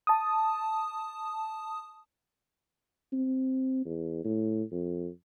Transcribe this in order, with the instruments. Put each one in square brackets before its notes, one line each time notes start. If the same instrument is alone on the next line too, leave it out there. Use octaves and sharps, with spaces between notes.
[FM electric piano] A5 D#6
[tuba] C4
E2
A2
F2